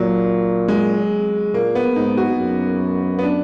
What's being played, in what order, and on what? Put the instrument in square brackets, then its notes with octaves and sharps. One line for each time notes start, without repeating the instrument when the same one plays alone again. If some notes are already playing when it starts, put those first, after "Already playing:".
Already playing: [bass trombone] A#2 [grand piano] F#3
[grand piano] G#3
[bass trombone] A#2 [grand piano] A#3
[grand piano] B3
[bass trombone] G#2 [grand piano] D#4
[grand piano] F#4
[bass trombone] F#2
[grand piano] B3
D4